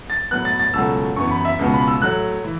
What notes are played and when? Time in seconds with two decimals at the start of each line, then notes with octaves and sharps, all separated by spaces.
0.10 A6
0.31 A2 F#3 B3 F#6
0.45 A6
0.60 A6
0.74 C#2 B2 F#3 A3 E6
1.16 F#2 E3 B3 C#6
1.31 B5
1.45 E5
1.59 C#2 B2 B3
1.73 B5
1.88 E6
2.02 A2 F#3 A3 F#6
2.44 E3